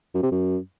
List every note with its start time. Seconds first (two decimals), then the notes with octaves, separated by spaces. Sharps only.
0.15 F#2
0.23 C3
0.31 F#2